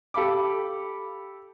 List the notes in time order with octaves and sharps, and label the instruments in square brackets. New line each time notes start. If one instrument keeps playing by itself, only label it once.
[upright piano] G4 A4 F5 B5 D6